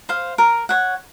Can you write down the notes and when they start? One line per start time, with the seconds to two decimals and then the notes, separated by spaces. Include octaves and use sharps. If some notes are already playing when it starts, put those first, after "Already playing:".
0.09 C5 F5
0.38 A#4
0.69 C#5 F#5